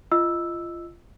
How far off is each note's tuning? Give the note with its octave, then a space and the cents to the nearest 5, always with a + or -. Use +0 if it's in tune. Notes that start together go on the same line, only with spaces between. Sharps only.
F4 -25 D#5 +0 E6 +0